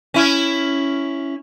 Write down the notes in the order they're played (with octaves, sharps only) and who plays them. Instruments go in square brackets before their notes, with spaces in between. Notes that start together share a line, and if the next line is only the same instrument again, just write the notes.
[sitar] C#4 E4